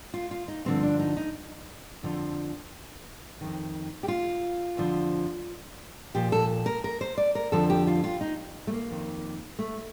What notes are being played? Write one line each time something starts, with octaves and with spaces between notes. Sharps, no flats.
F4
F4
D#4
G2 D3 F3 C4
D4
D#4
D#4
F2 D3 F3
F2 D#3
G4
F4
F2 D3 F3
A#2 F3 G4
A4
A#4
A#4
C5
D5
A#4
F2 D3 F3 A4
G4
F4
F4
D#4
A3
A#3
F2 D#3
A3